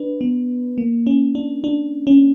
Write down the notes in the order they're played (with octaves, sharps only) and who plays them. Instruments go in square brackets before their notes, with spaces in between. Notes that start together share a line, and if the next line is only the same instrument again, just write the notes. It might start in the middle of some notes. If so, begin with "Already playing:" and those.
Already playing: [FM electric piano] D4 B4
B3
A#3
C#4
D4
D4
C#4